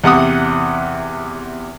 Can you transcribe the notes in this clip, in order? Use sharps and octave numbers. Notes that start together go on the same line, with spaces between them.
E2 C3 F#5 D#6